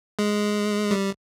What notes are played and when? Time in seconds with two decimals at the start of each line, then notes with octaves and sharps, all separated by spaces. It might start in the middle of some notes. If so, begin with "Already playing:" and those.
0.19 G#3
0.91 G3